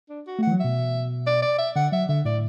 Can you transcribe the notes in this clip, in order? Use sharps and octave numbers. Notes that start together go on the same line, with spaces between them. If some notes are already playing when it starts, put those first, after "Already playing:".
D4
F#4
A3
E3 F#5
F#3
B2 E5
D5
D5
E5
D3 F#5
F#3 E5
D3 E5
A2 D5